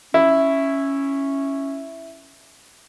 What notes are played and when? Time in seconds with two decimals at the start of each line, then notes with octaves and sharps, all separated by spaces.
0.14 C#4 E4